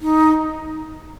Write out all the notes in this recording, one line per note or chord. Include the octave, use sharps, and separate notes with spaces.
D#4